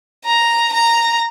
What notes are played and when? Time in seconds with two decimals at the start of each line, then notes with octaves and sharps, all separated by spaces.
0.25 A#5
0.73 A#5